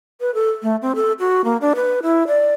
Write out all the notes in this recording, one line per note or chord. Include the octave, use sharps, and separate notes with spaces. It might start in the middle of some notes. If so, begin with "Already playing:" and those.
B4
A4
A3
C4
A4
F#4
A#3
D4
B4
E4
D5